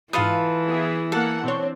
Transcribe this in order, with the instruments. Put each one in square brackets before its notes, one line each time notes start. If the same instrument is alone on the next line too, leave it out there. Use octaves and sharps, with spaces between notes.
[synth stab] G#2 F5 D#6 [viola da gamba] E3 [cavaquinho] F4 A4 B4
[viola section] B3 E4 G#4
[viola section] A#3 F#5 [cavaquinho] A4
[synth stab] B2 C#5 [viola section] C4 D4